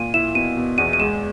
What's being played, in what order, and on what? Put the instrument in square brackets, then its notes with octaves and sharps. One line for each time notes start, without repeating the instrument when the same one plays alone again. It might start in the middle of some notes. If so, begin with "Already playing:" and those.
Already playing: [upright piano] A#2 [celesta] D#7
[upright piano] E4 [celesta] E7
[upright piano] B2 [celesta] D#7
[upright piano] B2
[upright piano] E2 [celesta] D#7
[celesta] D#7
[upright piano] G#3 [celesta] E7